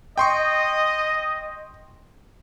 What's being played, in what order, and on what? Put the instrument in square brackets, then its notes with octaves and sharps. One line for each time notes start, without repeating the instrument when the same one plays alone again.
[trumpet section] D#5 [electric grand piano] G5 C6 C#6